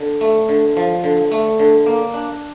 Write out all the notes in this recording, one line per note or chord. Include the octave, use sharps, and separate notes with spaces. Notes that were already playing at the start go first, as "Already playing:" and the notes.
Already playing: D3
A3
D3
F3
D3
A3
D3
A#3
D4